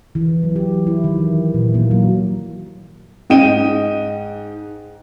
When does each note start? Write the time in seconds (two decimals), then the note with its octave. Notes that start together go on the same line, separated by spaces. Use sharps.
0.15 E3
0.43 F#3
0.56 G4
0.87 E4
1.04 D#3
1.19 E3
1.54 A#2
1.74 A#3
1.91 F#3
3.30 G#2 D#5 G5 D#7